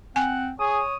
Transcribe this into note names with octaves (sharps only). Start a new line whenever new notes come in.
C4 F#5 G#5
G#4 C#5 D#6